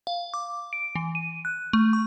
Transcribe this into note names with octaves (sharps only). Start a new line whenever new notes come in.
F5
D6
D7
E3
D#7
F#6
A3
C#6